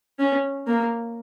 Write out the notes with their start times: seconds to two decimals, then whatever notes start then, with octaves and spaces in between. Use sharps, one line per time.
0.19 C#4
0.67 A#3